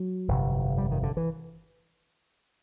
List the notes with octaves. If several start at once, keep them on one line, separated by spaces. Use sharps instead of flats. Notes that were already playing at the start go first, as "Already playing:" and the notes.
Already playing: F#3
G1 F2 C3
G3
D#3
D3
E3